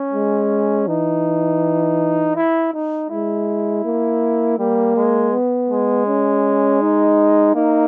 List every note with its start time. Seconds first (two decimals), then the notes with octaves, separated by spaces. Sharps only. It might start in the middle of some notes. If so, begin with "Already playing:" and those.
Already playing: C#4
0.13 G#3
0.87 E3 D#4
2.36 E4
2.73 D#4
3.10 G#3 E4
3.85 A#3
4.58 G3 A#3
4.96 G#3
5.33 B3
5.70 G#3
6.07 C#4
6.82 D#4
7.55 A#3 D#4